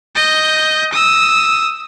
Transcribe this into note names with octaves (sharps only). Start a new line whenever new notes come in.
D#5 G6
D#6 E6